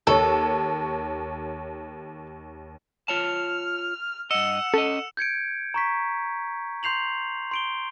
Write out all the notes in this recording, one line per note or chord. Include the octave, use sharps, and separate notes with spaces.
D#2 A4 C#5
F4 C#5 A5 F6 F7
G2 D#5 F#5 E6 C#7 E7
C#4 A4 D#5
G6 G#6 C#7 D7
A#5 C#6 B6
C6 G6 C7 F7 F#7
C6 D7 G7